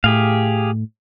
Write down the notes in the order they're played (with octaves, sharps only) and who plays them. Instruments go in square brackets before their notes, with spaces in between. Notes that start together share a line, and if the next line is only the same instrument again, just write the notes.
[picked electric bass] A2 [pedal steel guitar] G4 G#4 F5